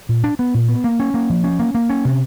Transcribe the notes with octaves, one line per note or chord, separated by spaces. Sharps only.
A#2
D4
B3
A#2
B3
A#3
C#4
A#3
F3
C#4
A#3
A#3
C#4
C3